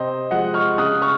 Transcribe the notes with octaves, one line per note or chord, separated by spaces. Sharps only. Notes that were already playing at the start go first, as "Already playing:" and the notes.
Already playing: C3 C5 D#5
F3 G#3 D#5 F#5
C#6 F6
C#3 D#6 F#6
C#6 F6